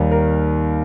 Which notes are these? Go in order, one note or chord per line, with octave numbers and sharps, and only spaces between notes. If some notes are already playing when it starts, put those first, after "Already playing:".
Already playing: D#2 D#3 G3
A#4